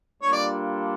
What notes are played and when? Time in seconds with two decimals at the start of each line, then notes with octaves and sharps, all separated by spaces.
0.22 G3 A#3 D4 F4 A4 C#5
0.33 D5